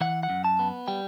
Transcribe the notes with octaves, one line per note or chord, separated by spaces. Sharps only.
E3 F#5
F#5
F#2
A5
B3
G3 G5